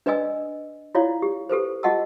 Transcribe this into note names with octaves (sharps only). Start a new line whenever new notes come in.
D4 B4 D5 D#5 G#5 E6
E4 F4 C#5 D5 F5
G4
G4 A4 B4 C5
F4 G4 D#5 F#5 A5 E6